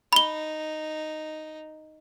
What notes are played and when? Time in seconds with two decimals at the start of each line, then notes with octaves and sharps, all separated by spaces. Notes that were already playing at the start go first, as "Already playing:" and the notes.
0.13 D#4 B5 G7